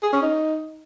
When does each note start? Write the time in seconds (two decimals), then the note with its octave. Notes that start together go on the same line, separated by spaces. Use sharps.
0.03 G#4
0.13 C#4
0.22 D#4